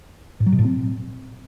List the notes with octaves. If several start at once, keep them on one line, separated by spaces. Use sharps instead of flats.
A2
F#3
B2
A2
C4